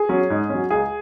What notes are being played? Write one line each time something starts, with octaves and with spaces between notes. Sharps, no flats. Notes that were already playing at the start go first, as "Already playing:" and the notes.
Already playing: G#4
F#3 C#4
G#2
F#3 C#4
C#2 G#4